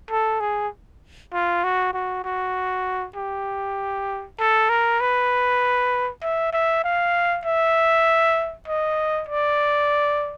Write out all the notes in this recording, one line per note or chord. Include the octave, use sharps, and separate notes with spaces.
A4
G#4
F4
F#4
F#4
F#4
G4
A4
A#4
B4
E5
E5
F5
E5
D#5
D5